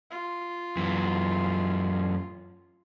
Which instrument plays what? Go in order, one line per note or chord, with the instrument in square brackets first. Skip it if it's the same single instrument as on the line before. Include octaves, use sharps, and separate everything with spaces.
[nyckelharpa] F4
[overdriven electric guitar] F#2 E3